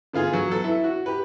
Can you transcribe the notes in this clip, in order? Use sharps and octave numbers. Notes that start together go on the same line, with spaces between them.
D3 B3 F4 G#4
F#3
B3 A4
E4
F#4
G4 B4